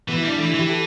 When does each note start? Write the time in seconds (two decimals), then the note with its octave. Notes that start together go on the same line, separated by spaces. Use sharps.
0.08 E3 B3
0.18 G3 E4
0.28 D4
0.38 E3 A3
0.49 E4
0.54 E3 G4
0.68 A4